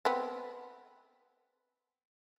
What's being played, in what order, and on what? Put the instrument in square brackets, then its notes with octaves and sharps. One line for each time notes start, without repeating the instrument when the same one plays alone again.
[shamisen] B3 C4